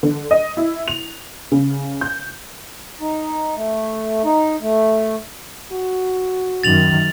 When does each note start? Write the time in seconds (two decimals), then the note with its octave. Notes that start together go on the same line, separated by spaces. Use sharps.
0.03 D3
0.31 D#5
0.57 E4
0.88 F7
1.52 C#3
2.01 G6
3.01 D#4
3.56 A3
4.25 D#4
4.61 A3
5.72 F#4
6.63 F#2 D#3 A6 F7 F#7